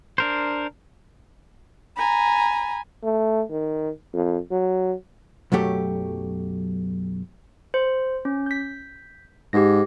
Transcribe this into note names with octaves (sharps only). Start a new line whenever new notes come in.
D4 A#4 C5
G#5 A#5 B5
A3
D#3
F2
F#3
B1 F#2 F#3 A3 G4 C#5
C5
C#4
G6 B6
G#2 G4 A#6